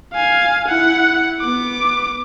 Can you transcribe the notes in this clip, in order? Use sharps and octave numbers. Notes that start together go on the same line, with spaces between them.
F5 G#5
E4 F#5
B3 D6